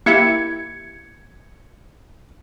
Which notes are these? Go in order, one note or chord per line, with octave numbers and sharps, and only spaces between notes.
A#3 E4 G4 G#6 C#7